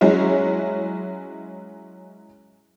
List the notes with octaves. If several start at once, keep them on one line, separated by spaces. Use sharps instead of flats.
F#3 G#3 C#4 E4